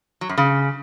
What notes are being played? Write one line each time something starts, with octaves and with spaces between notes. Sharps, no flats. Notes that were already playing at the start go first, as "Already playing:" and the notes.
F#3
F#2
C#3